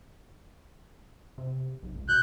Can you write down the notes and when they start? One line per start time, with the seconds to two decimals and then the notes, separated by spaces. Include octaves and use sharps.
1.38 C3
1.83 B1
1.95 C#2
2.09 B2 F#6 G6